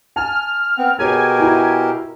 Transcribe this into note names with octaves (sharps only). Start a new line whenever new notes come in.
G#5 A5 F6
B3 C4
B2 G4 G#4 A#4 C#5 G#5
E4 F#4 A#5